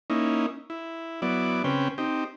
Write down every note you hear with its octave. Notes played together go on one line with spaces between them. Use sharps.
A#3 C#4 D#4 E4
E4
F#3 B3 E4 D5
C#3 C4 C#4 B4 G5
C4 D#4 G4